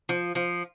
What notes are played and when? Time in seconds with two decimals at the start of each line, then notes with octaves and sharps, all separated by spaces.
0.09 F3
0.35 F3